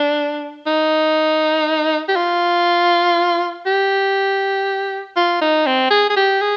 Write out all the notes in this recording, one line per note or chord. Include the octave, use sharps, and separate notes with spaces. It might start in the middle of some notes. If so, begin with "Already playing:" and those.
Already playing: D4
D#4
G4
F4
G4
F4
D#4
C4
G#4
G#4
G4
G#4